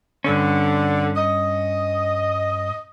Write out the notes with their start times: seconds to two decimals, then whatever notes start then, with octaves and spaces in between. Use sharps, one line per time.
0.24 G2 D3 C#4
1.16 D#5